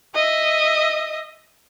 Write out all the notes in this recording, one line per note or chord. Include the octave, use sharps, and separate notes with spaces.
D#5 E5